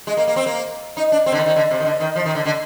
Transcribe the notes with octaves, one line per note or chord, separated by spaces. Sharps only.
G#3
A#3
A#3
C4
A#3
D#4
D4
C4
D3
D#3
D#3
D3
C3
D#3
D3
D#3
F3
D#3
D3
D3